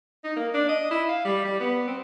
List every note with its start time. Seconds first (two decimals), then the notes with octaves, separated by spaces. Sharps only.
0.24 D#4
0.36 A#3
0.54 D4
0.69 D#5
0.91 E4
1.09 F5
1.25 G3
1.45 G3
1.60 B3
1.87 C4